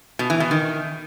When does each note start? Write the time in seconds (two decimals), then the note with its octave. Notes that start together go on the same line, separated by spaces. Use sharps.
0.19 B2
0.30 E3
0.40 B2
0.51 D#3